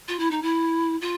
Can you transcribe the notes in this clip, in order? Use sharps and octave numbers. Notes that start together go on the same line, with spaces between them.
F4
E4
D#4
E4
F4